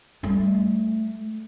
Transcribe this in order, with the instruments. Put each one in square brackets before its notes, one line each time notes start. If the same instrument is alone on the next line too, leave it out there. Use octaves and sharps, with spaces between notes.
[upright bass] G3 A3